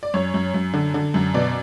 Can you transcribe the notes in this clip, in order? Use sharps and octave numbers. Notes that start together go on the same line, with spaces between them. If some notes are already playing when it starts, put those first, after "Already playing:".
D5
F#2 C#5
F#2
F#2
D3
D3
F#2
B2 D5